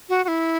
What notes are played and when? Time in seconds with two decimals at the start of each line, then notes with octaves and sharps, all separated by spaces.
0.09 F#4
0.25 F#4
0.28 E4